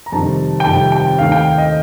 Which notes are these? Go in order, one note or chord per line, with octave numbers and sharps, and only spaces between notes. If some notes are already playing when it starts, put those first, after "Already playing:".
A#5
F2 C3 D#3 G3 A5
G5
F2 C3 D#3 G3 A5
G5
D#2 D#3 A3 F5
G5
F5
D#5